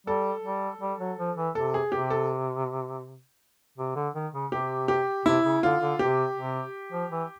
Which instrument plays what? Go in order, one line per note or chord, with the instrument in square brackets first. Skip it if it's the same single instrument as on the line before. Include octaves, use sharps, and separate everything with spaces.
[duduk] G3 [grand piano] A4
[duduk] G3
G3
F#3
F3
E3
[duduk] C3 [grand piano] A4
[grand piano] G#4
[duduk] C3 [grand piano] G4
[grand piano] A4
[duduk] C3
D3
D#3
C#3
[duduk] C3 [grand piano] G4
[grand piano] G4
[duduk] C3 [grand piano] E4
[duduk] C#3
[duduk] D3 [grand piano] F4
[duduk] D3
[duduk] C3 [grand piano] G4
[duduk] C3
F3
E3